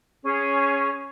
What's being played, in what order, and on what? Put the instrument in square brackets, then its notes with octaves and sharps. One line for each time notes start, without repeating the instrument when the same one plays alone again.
[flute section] C#4 G#4